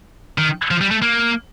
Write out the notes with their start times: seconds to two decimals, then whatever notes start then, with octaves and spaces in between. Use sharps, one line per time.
0.38 D#3
0.71 F3
0.81 G3
0.91 A3
1.02 A#3